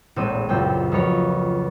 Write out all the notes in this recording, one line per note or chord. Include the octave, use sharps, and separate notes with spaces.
E1 A#1 A2 C4 D#7
C#2 F#2 C4 G5
F2 F#3 A#4 B4 C#5 F6